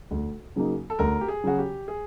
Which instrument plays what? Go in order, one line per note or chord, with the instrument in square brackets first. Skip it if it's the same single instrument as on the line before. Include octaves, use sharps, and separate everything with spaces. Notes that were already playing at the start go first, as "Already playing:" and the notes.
[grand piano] D2
C#3 F#3 A#3 D#4
[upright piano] A4
[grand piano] D2 [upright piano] A#4
[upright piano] G4
G#4
[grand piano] C#3 F#3 [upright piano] F#4
[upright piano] G4
G#4